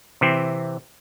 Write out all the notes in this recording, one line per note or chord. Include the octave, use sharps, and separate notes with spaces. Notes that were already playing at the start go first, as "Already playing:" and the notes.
C3 E3 C4